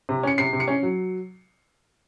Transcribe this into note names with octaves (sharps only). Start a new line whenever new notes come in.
C3
C#4 C#7
C3 C7
C3
C#7
C#4
F#3